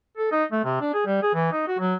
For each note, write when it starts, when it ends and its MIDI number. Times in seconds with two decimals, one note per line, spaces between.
0.17 0.31 69
0.32 0.44 63
0.52 0.62 57
0.64 0.80 48
0.81 0.90 62
0.94 1.02 68
1.06 1.21 55
1.22 1.32 68
1.34 1.48 52
1.52 1.65 63
1.67 1.78 66
1.79 1.95 54